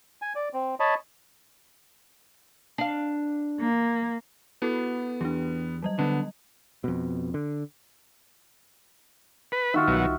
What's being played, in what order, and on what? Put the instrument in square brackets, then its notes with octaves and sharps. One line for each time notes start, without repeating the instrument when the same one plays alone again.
[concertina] G#5
D5
C4
C#5 D#5 A5 B5
[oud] D4 F5
[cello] A#3
[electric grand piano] B3 [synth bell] E4 F#4 A4
[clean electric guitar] E2 [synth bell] D4 G4
[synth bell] F#3 G3 D#5
[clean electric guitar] D3 [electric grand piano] B3
[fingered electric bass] F2 B2
D3
[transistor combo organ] B4
[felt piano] D#3 [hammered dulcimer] F4 F#4 E5
[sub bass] C2 [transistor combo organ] B2 F#3